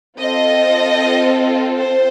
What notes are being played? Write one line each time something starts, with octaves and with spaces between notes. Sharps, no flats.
C4 F4 A4 D#5
C5